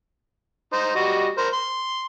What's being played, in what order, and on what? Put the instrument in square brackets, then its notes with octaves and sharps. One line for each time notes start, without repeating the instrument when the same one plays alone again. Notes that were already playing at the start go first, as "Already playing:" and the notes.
[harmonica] D#4 C5
G3 F#4 D#5
A#4 C5
C6